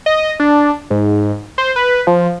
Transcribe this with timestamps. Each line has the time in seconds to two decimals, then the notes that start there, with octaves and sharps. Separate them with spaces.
0.06 D#5
0.40 D4
0.90 G#2
1.58 C5
1.76 B4
2.07 F3